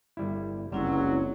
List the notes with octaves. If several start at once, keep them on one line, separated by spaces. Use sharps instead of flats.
G1 G3 E4
F#1 C#2 F#3 G3 C4 C#4 E4